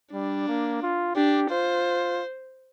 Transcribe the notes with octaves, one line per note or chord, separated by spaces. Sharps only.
G3 D4
A#3
F4
D4 G4
F4 C5